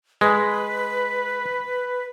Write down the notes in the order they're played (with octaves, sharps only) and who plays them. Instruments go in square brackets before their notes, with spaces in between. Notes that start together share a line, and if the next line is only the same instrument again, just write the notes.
[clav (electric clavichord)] G#3 [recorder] B4